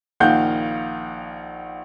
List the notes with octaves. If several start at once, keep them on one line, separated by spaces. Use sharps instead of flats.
A#1 D#3 F5 F#5 G6